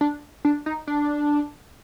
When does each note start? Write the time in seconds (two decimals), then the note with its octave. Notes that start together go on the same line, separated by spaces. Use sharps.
0.01 D4
0.45 D4
0.66 D#4
0.87 D4